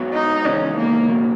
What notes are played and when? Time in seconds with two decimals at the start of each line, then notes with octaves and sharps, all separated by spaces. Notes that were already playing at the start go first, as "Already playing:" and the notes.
Already playing: G#2 F#3 B3 F#4 C#5
0.14 D#4
0.44 C#3 E3 G#3 B3 C#4 D#4
0.76 A#3
1.08 B2 F#3 A#3